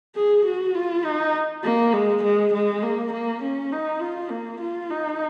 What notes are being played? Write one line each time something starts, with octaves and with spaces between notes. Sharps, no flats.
G#4
F#4
F4
D#4
A#3
G#3
G#3
G#3
A#3
A#3
C#4
D#4
F4
A#3
F4
D#4